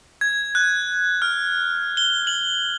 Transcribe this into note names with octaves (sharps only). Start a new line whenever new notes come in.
G#6
F#6
F6
G7
F#7